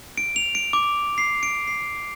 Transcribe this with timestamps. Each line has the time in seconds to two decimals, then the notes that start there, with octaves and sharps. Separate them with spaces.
0.17 D7
0.36 F7
0.55 D7
0.73 D6
1.18 C7
1.43 D7
1.67 C7